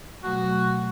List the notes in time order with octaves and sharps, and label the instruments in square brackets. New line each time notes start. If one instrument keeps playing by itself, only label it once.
[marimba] B2 F#3 A3 [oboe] F#4